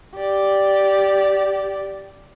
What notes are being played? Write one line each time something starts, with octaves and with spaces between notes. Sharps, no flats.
G4 D5